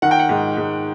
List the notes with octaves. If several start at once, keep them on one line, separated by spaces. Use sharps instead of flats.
D#3 F#5
G5
F#5
G#2
G#2